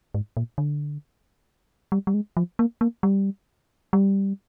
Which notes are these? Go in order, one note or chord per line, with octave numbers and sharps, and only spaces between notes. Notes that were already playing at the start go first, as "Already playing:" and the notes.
G#2
A#2
D3
G3
G3
G#3
F3
A#3
A#3
G3
G3